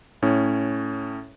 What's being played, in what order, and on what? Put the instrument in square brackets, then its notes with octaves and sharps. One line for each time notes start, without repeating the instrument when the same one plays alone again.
[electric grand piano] A2 C#4